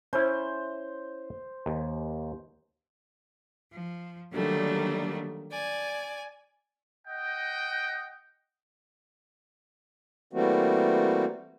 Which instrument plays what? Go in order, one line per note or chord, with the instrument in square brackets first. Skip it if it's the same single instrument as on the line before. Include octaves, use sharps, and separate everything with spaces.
[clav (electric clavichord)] C#4 E4 [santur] C5
[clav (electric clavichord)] D#2
[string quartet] F3
D3 D#3 F#3 G3 A3 A#3
D5 G#5
[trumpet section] D#5 F#5 G5
[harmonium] E3 G3 A3 A#3 C4 F#4